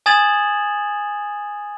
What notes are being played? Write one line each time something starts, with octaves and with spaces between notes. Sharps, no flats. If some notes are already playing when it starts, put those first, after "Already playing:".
G#5 D#6 G#6 A6 E7 F#7